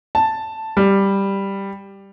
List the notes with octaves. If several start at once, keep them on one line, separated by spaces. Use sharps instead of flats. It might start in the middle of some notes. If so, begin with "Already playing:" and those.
A5
G3